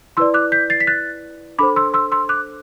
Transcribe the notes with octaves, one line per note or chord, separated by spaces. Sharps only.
E4 B4 D5 C6 E6
D6 F#6
G6 B6
A6 C7
B6
F#6 A6
D4 A4 C5 B5 D6
C6 E6
C6 E6
C6 E6
D6 F#6